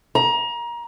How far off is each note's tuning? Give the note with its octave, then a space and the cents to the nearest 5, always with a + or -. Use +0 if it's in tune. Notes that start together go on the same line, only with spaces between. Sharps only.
A#5 +30